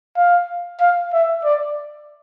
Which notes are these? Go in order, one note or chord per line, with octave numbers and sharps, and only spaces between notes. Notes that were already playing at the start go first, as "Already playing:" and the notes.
F5
F5
E5
D5